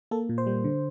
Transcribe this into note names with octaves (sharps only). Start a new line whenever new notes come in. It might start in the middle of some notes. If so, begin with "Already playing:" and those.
A#3 A4
A#2
C5
G3
D3